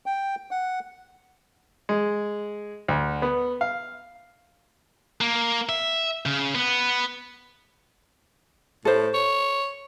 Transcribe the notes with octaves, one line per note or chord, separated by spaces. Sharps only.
G5
F#5
G#3
D2
B3
F5
A#3
E5
C#3
B3
A2 A4 C5
C#5